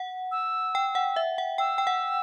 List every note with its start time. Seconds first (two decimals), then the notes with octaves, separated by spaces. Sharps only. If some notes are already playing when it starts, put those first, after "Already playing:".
Already playing: F#5
0.32 E6
0.75 G5
0.95 F#5
1.16 E5
1.38 F#5
1.58 G5 E6
1.78 G5
1.87 F#5